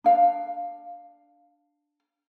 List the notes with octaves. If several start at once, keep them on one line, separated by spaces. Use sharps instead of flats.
D4 F5